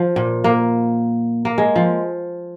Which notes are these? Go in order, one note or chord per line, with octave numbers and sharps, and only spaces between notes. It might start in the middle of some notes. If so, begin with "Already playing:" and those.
Already playing: F3
A#2
A#3
A#3
G#3
F3